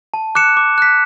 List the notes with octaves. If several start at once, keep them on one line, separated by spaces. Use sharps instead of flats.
A5
D6 F#6 C#7 E7
D6
F#6 B6